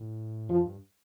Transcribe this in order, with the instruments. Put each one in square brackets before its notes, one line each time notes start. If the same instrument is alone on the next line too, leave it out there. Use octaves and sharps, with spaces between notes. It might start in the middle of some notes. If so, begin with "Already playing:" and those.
Already playing: [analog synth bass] A2
[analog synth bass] F2 [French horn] F3
[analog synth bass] G2